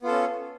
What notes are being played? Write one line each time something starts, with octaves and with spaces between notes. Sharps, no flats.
B3 C#4 F4 A4